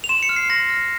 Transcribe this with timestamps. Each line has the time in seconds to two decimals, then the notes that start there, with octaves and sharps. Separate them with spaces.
0.04 F7
0.09 C6 E7
0.23 C#7
0.29 F6
0.36 C7
0.50 C6 A#6
0.70 F6